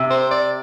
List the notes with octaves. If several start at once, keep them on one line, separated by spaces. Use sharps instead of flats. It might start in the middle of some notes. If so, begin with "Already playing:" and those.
Already playing: C3
C5
D5